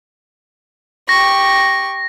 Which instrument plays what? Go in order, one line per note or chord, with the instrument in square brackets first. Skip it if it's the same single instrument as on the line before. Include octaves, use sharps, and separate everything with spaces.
[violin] G4 C#6 [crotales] A#6